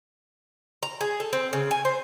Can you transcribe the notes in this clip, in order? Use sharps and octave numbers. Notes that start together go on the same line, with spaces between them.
A#5
G#4
A4
C4
C#3
G#5
C5